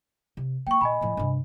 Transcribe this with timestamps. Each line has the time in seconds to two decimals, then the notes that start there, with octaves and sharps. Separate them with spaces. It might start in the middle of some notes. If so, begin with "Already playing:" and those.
0.37 C3
0.67 A#3 G5 C#6
0.81 A#2 D#5 G#5 B5
1.01 A2 F3
1.17 G2 C3